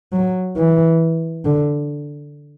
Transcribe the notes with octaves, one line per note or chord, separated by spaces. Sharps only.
F#3
E3
D3